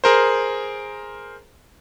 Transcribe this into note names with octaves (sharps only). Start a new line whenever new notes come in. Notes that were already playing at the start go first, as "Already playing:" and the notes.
G#4 A#4 C5